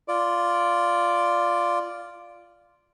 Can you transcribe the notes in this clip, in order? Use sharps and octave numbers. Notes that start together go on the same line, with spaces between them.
F4 D5